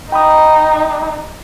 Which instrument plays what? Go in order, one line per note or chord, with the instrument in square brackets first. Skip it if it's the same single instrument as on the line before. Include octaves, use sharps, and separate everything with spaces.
[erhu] D#4 [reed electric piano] G5 B5 D#6